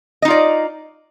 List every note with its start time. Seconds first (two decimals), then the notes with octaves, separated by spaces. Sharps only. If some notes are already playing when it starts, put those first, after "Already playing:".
0.22 D#5
0.25 D#4
0.28 F4
0.30 D5